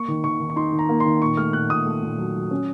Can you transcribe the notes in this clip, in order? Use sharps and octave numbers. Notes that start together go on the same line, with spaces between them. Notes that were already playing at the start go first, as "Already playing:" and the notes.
Already playing: A#3 C#6
D#3
D#3 C#6
D#3
C#6
D#4 C6
D#3
A#5
A#3
D#3 C6
A#2 C#6
A3 F6
A#2 F#6
A#2 D#6
A3
A#2
F#3
F#3
C#4